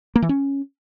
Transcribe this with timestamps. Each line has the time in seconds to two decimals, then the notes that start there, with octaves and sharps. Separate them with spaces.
0.16 A#3
0.22 E3
0.29 C#4